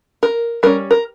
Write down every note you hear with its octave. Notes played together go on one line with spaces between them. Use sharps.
A#4
G3 C#4 A#4
A#4